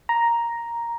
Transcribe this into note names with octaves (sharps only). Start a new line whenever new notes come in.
A#5